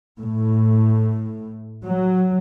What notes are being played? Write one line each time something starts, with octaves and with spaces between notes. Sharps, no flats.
A2
F#3